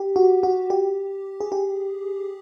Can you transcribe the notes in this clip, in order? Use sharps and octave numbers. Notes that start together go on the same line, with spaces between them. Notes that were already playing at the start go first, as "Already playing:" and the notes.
Already playing: G4
F#4
F#4
G4
G#4
G4